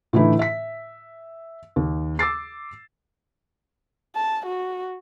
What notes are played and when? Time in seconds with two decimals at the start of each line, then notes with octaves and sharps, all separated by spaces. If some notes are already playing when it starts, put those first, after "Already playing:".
0.13 A2 D3 E3 A3 D#4 E4
0.39 E5 B6
1.76 D#2
2.19 D6 E6 A6 C7
4.15 A5
4.46 F#4